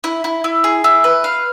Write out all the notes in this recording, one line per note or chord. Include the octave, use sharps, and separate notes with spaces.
E4
E4
E4
G#4
E4
B4
F5